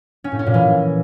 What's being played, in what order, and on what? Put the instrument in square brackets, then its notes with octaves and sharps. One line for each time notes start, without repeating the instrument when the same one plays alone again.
[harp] C#4
A2
C#4
A#2
E3